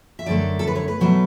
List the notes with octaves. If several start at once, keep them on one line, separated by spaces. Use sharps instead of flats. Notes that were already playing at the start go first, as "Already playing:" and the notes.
E5
F#2 D3 A3 D5
A4
B4
C#5
B4
B2 F#3 A3 B4